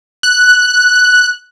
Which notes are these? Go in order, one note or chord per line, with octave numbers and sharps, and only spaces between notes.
F#6